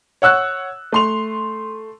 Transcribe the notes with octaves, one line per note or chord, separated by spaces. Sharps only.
C#5 F#5 E6 F#6
A3 C6 F7